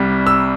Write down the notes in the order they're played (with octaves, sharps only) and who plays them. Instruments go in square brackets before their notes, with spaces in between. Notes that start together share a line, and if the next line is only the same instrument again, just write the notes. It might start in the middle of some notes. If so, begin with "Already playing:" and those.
Already playing: [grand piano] C2 C3 G3
E6